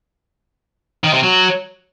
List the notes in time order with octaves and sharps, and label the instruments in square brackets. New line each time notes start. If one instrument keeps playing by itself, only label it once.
[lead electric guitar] D#3
C3
F#3